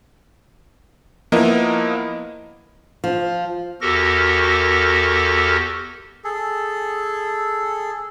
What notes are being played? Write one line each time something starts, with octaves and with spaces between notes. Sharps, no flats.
F3 A#3 B3 E4 A#4 D#5
F3
E2 F#4 G4 A4 A#4 A#6
G#4 A4